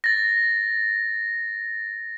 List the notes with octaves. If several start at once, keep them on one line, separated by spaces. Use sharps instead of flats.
A6 A#6